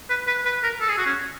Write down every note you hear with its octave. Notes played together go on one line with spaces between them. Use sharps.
B4
B4
B4
A#4
A4
G#4
F#4
C#4